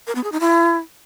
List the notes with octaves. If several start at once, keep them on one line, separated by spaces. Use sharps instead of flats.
A#4
B3
G#4
D#4
E4